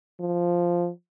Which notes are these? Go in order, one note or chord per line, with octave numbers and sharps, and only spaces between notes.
F3